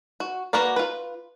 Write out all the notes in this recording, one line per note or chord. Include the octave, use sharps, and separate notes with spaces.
F#4
A#3 F#4 A#4 B4 D5
F4 B4